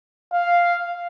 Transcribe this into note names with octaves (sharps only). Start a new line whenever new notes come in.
F5